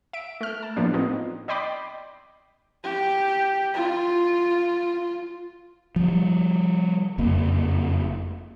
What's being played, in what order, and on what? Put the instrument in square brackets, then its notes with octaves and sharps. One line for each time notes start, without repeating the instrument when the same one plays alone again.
[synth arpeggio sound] E5 D7
A3 F6
A5
A2 F3 A#3 B3 D4
B3 C4 D#4 F4
D5 D#5 G5 B5 C6 D6
[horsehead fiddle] G4
F4
[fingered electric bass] F3 G3
F#1 F2 A#3